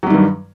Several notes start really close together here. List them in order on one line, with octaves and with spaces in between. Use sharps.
F#3 G3 D#3 G2